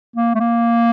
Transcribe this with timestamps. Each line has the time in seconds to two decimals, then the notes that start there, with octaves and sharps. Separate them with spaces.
0.16 A#3
0.35 A3
0.40 A#3